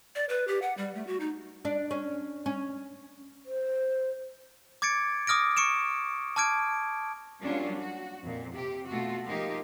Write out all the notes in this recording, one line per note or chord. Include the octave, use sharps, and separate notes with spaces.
D5
B4
G4
F#5
G3
A3
F#4
D#4
D4
C#4
C#4
C5
D6 G#6 A6 C#7 D7
D6 D#6 F6 A#6 D7
C#6 C#7 D7 E7
A5 D6 F6 G#6 D7
F#3 G3 A#3 C#4 D4 F4
F#4
F2 A#2
C3 G4
B2 A3 F4 F#4
F3 A#3 D#4 F4 G4